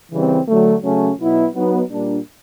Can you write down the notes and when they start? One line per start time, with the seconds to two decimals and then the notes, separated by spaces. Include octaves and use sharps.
0.11 C#3 E3 G3 C4
0.46 D3 F#3 A3
0.82 C#3 F#3 A3 C#4
1.18 B2 F#3 B3 E4
1.54 F#3 B3 D#4
1.90 A#2 G3 A#3 D4